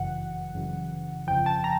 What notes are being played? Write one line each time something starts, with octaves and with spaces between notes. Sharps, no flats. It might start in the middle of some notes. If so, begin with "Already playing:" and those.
Already playing: G1 F#2 C#3 E3 F#5
G1 F#2 C#3 E3
G1 F2 C#3 F3 G5
A5
A#5